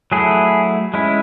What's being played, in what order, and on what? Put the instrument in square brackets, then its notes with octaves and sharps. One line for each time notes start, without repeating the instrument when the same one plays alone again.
[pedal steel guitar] F#3 A3 E4 G#4
G#3 C#4 E4